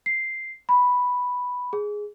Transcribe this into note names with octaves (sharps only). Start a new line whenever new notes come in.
C7
B5
G#4